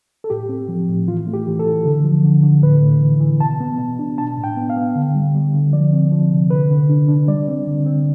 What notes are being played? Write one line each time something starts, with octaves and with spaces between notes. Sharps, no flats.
A4
A2 G4
C4
F3
A2
E3 F4
A3
G4
E3
A4
E3
D3
F3
D3
D3
A2 B4
A2
E3
E3
B2 A5
B3
B2
D4
D4 A5
A2
G5
B3
F5
B3
D3
G3
G3
D3
F3 D5
C4
F3
C3
D3 B4
D3
D4
D4
G3 D5
C4
D3
C4